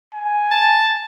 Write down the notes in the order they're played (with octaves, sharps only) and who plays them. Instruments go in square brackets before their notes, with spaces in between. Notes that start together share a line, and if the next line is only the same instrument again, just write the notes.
[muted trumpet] G#5
[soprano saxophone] A5